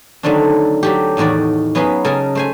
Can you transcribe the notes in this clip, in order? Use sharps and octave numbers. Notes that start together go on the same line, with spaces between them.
D3 D#3 F#3 A3 C4 D4
F#3 A3 G4
E2 A2 D#3 F#4 D5
F#3 B3 C#4 G#4 B4 F5
C#3 A4 A#4 D#5 G#5
A3 C5 G#5